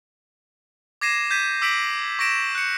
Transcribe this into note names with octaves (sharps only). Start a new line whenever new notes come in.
D6 G#6 A#6 C7 D#7 E7
G6 G#6 B6 D#7
D6 E6 B6 D7 F#7
C#6 A#6 D7 E7
F#6 C#7